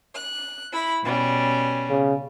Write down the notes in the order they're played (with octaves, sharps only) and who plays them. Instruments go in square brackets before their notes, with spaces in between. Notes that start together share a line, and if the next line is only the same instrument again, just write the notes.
[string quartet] F#6
E4 B5
B2 G3 C#4
[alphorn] C#3